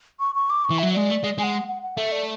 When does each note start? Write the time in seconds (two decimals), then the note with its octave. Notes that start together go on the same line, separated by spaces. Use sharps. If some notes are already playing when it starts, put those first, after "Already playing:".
0.20 C#6
0.35 C#6
0.50 D6
0.65 C#6
0.70 E3
0.79 F#3 E5
0.94 G#3 D5
1.09 A3
1.24 G#3
1.38 G#3 G#5
1.43 F#5
1.68 F#5
1.83 F#5
1.97 A3 E5
2.12 D5